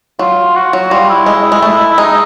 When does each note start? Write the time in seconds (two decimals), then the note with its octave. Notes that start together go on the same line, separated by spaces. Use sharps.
0.19 F#3 F4
0.55 F#4
0.73 F#3
0.91 G3 F4
1.09 E4
1.26 G#3
1.52 G#3
1.62 A3
1.98 G#3 D#4